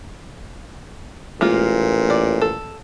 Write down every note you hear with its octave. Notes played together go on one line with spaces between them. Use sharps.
A1 A#2 G#3 A#3 F4
D5
A4